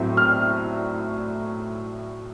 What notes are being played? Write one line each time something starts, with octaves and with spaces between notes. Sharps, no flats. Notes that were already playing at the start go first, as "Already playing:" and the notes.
Already playing: A2 F#3 A3 C4
F6